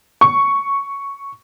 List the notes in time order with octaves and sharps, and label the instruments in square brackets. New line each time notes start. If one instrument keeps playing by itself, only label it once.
[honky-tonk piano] C#6